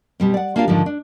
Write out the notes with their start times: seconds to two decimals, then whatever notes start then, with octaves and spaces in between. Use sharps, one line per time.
0.20 B2 G3 C4
0.34 D5 F#5
0.56 A#3 D4 F4 G4 F5
0.68 G#2 D3 D#3 F3
0.86 D4